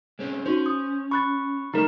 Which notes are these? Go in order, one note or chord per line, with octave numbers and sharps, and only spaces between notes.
G#3 C4 C#4
C#4 D#4 F#4 C5
D#6
B5 C#6 F#6 A6
F3 G3 A3 D#4 A#4